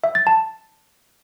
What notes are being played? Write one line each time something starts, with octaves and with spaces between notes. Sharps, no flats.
E5
A6
A5